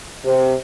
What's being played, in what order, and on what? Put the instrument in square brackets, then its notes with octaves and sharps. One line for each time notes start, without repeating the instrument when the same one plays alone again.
[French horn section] C3